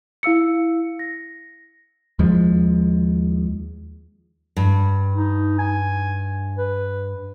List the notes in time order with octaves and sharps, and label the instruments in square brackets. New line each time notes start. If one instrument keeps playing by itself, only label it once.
[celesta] E4 F5 E6 C#7
A#6
[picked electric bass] D#2 F3 G#3
[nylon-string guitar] G2
[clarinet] D#4
G#5
B4